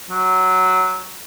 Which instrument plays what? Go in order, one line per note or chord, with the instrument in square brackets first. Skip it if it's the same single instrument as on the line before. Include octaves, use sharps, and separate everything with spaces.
[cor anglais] F#3